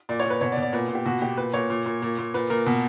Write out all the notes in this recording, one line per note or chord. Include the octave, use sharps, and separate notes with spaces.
A#2 D5
C#5
A#2 B4
B2 C#5
D5
B2
D5
A#2 B4
A#2
G4
B2 F#4
B2 G4
A#2 B4
A#2 C#5
A#2
A#2
A#2
A#2
A#2 B4
A#2 A#4
B2